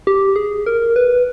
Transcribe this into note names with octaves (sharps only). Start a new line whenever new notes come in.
G4
G#4
A#4
B4